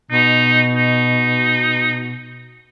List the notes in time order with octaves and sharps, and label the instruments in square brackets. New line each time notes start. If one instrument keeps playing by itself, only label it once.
[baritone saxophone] B2 [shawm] D#4
[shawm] D#4